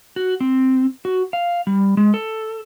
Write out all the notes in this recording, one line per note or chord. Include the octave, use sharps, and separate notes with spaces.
F#4
C4
F#4
F5
G3
G#3
A4